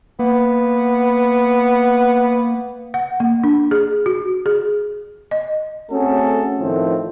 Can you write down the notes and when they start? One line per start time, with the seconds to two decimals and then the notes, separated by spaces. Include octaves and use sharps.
0.19 A#3 B3
2.94 F#5
3.20 A#3
3.44 D4
3.71 G#4
4.06 F#4
4.46 G#4
5.31 D#5
5.91 A3 C4 C#4 F#4 G#4 A4
6.60 A2 D#3 F3 A3 C4